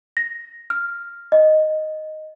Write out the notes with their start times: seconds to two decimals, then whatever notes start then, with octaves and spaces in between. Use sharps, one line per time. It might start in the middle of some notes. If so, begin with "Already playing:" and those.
0.17 A#6
0.70 F6
1.32 D#5